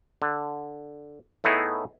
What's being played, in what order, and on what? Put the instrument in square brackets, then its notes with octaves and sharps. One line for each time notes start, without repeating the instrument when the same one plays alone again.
[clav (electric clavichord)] D3
A2 A3 B3 D#4 E4 G#4